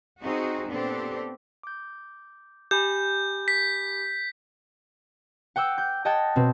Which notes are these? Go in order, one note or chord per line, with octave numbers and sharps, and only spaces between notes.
C4 D#4 F#4 G#4
A#2 B3 C4 D4 G4 A4
D6 G6
G4 G#5 B5 G6
B6
F#5 G5 D6 E6
G6
D#5 F#5 G5 A5 G#6 A6
B2 C4